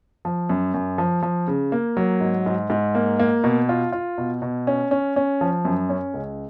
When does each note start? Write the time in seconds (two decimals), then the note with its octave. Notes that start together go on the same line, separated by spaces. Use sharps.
0.25 F3
0.49 F#2
0.74 F#2
0.98 F3
1.22 F3
1.48 C#3
1.72 A#3
1.97 F#3
2.20 G#2
2.46 G#2
2.70 G#2
2.95 A#3
3.19 A#3
3.44 B2
3.69 F4
3.92 F4
4.18 B2
4.42 B2
4.67 C#4
4.91 C#4
5.16 C#4
5.41 F3
5.65 F#2
5.89 C#4
6.14 C#2